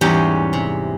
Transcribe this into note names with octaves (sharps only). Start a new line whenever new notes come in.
E2 G#2 G3 C#4 G4
C3